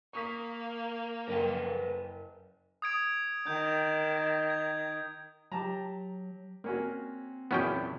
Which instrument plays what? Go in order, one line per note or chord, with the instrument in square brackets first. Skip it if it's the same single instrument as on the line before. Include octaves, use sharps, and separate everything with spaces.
[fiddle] A#3 [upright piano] C#6 D#6 B6
[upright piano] F#1 [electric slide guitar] A#4 B4 G5
[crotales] D#6 G#6 D7
[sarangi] D#3 [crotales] G6
[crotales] G#6
[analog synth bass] F#3 [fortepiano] G4 A5 A#5
[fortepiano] A#3 C#4 F#4 [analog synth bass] C4
[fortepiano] E2 A#2 F#3 [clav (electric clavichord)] B3 C#4 G5